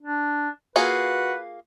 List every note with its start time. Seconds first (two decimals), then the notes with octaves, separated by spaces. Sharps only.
0.01 D4
0.76 A#3 F4 F#4 G#4 B4